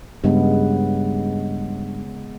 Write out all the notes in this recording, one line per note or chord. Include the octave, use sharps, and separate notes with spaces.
G2 C#3 G#3 B3